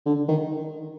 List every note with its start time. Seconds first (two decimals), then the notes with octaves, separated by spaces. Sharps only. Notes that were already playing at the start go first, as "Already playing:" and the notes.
0.06 D3
0.28 D#3